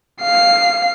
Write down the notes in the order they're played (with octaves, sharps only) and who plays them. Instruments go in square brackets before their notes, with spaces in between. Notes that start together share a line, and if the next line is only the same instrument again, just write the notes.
[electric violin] F5 C7